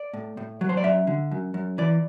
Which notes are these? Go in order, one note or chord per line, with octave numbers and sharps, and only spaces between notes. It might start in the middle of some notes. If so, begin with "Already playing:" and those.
Already playing: D5
A2
A2
F#3
C5
D5
F#2 E5
D3
F#2
F#2
E3 D5